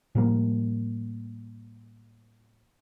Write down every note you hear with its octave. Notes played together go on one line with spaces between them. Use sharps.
A2 F3 G3 A#3